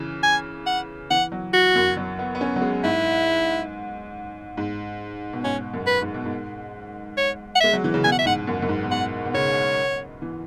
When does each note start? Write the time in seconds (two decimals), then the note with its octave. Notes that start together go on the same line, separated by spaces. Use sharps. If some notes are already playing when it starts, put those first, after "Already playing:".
Already playing: C#3 E3
0.23 G#5
0.67 F#5
1.11 E3 F#5
1.32 F#3
1.54 F#4
1.76 F#2
1.97 F#3
2.19 B3
2.35 B3
2.41 C#4
2.56 F#3
2.62 G#3
2.84 G#2 E4
4.57 G#2
5.33 B2
5.44 G#2 C#4
5.74 F#2
5.87 B4
6.02 G#2
6.14 B2
6.26 G#2
7.18 C#5
7.56 F#5
7.61 G#3 E5
7.73 F#3
7.84 E3
7.94 C#3
8.04 B2 G#5
8.12 F#5
8.19 E5
8.26 G#2 F#5
8.47 F#2
8.62 F#2
8.69 G#2
8.83 B2
8.91 G#2 F#5
9.25 B2
9.34 C#3 C#5
10.22 E3